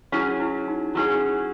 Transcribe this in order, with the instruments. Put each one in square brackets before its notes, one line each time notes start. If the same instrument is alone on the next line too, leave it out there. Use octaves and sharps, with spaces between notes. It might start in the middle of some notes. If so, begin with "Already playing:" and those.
[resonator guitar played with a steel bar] F#3 C#4 G#4 [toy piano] E4
[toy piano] E4
D#4
[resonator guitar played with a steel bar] F#3 C#4 G#4 [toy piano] E4